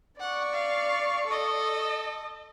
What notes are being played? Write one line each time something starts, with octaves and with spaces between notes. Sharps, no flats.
D5 F#5 C#6
F5
A4 D#5